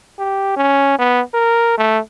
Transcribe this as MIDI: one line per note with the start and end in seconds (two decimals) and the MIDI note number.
0.18 0.55 67
0.57 0.96 61
0.99 1.21 59
1.34 1.76 70
1.78 1.99 57